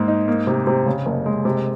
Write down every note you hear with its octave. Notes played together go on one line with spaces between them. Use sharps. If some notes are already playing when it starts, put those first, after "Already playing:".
Already playing: G#2 A#3
D#4
A#3
C3
C3
C#3
F#1
G#3
C3